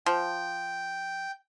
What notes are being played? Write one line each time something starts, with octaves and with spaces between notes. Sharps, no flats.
F3 G5